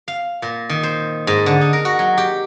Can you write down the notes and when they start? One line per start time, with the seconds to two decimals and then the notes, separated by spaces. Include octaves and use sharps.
0.08 F5
0.42 A#2
0.69 D#3
0.83 C5
1.27 G#2
1.46 D3
1.61 D#4
1.73 A#4
1.85 F#4
1.99 F#3
2.18 G4